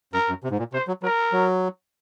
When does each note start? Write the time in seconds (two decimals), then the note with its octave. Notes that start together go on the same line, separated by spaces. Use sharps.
0.13 F#2 A#4
0.29 F#2
0.44 C3
0.51 G#2
0.59 A#2
0.73 C3 C5
0.88 F#3
1.03 F#3 A#4
1.32 F#3